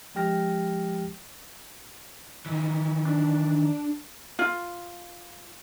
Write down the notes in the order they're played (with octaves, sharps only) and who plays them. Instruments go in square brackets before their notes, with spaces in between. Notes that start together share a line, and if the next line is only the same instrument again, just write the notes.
[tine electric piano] F3 G#3 G4 G5 F6 A#6
[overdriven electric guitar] D#3 E3
[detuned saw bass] D4
[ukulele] F4